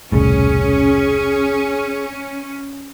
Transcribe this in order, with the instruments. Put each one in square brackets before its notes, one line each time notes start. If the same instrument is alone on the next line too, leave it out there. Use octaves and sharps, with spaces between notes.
[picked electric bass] E1 C2 A2 [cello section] C#4 [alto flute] G#4